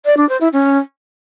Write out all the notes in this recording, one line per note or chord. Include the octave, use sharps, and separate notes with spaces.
D5
D4
C5
E4
C#4